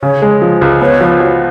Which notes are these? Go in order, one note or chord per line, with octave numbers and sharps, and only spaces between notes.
C#3 C#5
G#3
F3
C#2
B3 C#5
F3
F#4